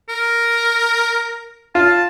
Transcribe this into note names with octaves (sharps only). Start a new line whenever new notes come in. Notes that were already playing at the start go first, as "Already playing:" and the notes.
A#4
F4 A5